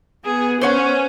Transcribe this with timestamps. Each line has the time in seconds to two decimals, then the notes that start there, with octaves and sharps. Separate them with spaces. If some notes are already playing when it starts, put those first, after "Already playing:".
0.25 B3 G#4
0.61 C#4 C5 C#5 F#5